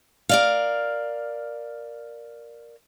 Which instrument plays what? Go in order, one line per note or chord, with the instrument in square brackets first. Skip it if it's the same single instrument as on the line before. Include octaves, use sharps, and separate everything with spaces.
[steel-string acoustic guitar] A#4 D5 F5